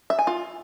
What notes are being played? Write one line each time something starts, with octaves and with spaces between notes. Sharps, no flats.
E5
G#5
F4